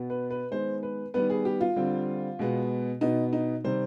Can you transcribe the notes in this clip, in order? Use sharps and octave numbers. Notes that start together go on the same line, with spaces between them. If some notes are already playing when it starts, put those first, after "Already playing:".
Already playing: B2 B3
B4
B4
D#3 G#3 B3 C5
B4
D#3 G3 B3 B4
G#4
G4
F4
D3 G3 C4
B2 G#3 B3
B2 B3 D#4
D#4
C3 D#3 G3 C5